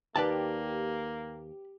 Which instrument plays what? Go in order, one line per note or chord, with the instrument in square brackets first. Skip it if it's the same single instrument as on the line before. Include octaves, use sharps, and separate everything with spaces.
[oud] D#2 [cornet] A#3 [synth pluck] G4 [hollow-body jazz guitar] B4 D5 A5